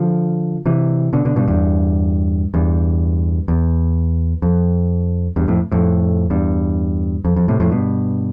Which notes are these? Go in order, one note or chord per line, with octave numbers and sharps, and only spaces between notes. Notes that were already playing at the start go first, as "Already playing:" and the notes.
Already playing: D3 F3
C3 E3
B2 D3
B2 D3
G2 B2
E2 G2
E2 G2
E2
F2
E2 G2
F2 A2
F2 A2
E2 G2
F2
F2
A2 C3
F2 A2
G2 B2